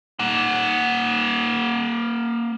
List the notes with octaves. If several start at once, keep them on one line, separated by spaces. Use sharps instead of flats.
A#3 F#5